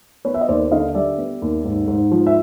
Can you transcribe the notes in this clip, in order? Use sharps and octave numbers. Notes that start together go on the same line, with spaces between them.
B3 B4 C#5
E5
D#5
D#2 C5 D5
D3 D#5 F5
G3 D5 E5
B3
D#2
G#2
G#2
F3
E5